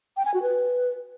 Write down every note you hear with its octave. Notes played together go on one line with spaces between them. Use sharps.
G5
G#5
F#4
B4